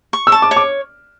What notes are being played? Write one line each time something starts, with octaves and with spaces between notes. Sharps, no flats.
C#6
E6
A5
D6
C#5
D6